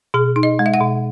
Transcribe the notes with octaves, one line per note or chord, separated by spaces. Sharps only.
B2 G#4
D#4
D#5
G#3
E5
F#5
B2